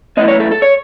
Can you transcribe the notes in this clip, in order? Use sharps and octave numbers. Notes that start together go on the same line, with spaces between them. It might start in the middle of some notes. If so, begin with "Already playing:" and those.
F#2 E3 A3 C4 D#5
C#5
A4
A4
C#5